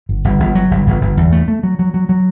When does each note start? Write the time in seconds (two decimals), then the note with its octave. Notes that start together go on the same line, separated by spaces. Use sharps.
0.09 G1
0.24 G1
0.40 G1
0.55 F#3
0.71 G1
0.87 G1
1.01 G1
1.17 E2
1.32 A3
1.48 A3
1.63 F#3
1.79 F#3
1.94 F#3
2.09 F#3